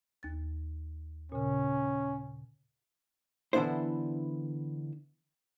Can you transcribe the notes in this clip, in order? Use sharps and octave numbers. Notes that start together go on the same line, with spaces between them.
D#2 A6
A#2 C#3 C#4
D3 E3 B3 D4 E4 C5